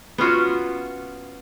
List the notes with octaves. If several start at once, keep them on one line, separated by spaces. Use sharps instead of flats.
B3 C#4 F4 F#4